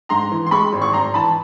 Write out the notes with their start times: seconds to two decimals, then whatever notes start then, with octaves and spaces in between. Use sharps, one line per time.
0.09 G#2 A#5 C6
0.31 E3
0.46 C6
0.51 G#3 B5 C#6
0.73 G#1
0.82 C#6
0.93 G#1 A#5 C6
1.14 E3 A5 B5